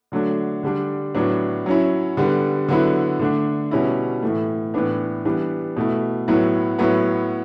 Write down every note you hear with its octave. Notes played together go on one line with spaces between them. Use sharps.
D3 F#3 A3 D4
D3 G3 D4
A2 F#3 B3 D4
F#3 C#4 E4
D3 G3 B3
D3 F#3 B3 E4
D3 A3 D4
B2 G3 C#4 E4
A2 E3 A3
A2 E3 B3 D4
E3 G3 B3 D4
B2 A3 E4
A2 F#3 B3 E4
A2 F#3 B3 E4